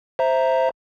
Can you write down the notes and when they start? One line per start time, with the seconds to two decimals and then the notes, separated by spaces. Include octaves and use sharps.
0.19 C5 E5 A#5